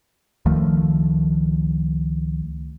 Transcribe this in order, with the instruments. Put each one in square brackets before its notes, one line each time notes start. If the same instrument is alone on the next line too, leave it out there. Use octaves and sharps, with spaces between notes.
[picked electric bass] C#2 D#3 F3 A3